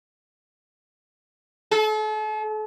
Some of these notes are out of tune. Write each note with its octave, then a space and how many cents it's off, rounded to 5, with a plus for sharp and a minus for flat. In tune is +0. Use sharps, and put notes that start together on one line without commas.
A4 -40